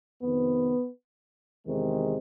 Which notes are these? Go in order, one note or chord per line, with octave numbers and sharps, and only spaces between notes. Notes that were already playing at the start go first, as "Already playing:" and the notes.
F2 C3 D#3 B3
E2 C3 D#3 G#3